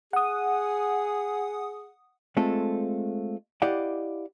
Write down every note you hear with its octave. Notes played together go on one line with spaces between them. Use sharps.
G#4 F#5 D#6
G#3 A3 C4 F4 A4
E4 G4 D5 D#5 F5 F#5